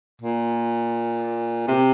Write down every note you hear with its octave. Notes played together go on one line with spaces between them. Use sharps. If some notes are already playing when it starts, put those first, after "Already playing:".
A#2
C3